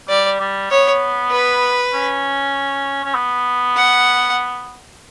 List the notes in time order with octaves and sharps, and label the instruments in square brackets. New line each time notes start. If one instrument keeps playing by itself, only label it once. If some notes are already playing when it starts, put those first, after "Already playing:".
[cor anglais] G3 [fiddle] D5
[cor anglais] G3
[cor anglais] B3 [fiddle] C#5
[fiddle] B4
[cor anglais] C#4
C#4
B3
[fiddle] F#5